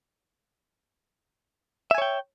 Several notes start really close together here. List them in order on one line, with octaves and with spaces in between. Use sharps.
E5 G#5 C#5 G5